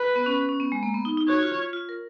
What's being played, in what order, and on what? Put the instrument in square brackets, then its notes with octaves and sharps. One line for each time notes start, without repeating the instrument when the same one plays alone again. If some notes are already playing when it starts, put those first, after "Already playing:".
Already playing: [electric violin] B4
[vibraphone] B3
C#4
C#4
B3
G#3
A#3
B3
D#4
D#4
[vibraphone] F#4 [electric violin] C#5
[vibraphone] F4
F4
F4
A#4